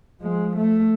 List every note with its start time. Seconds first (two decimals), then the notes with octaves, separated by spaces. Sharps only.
0.21 F3 G#3
0.56 A3